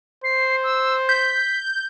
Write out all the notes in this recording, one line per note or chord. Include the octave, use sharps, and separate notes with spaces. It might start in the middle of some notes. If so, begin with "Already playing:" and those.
C5 C7
E6
G6 B6